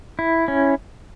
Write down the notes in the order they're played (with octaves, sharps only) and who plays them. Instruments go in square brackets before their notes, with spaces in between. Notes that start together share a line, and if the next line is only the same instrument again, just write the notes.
[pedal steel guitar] E4
C#4